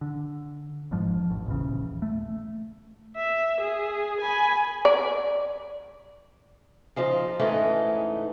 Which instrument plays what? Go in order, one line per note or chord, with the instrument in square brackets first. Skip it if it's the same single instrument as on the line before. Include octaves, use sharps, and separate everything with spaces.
[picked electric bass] D3
E1 G#2 F3
A1
D#1 A#1 E2 C#3
A3
[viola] E5
G#4
G#5 B5
[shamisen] D5
[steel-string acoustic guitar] C#3 F3 D#4
G#2 C#3 E3 A3 C#4 D#4